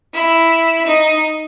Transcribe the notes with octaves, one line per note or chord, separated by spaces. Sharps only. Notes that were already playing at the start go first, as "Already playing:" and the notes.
E4
D#4